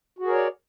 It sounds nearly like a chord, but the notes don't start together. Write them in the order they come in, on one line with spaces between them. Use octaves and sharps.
F#4 G#4 A#4 C#5 D5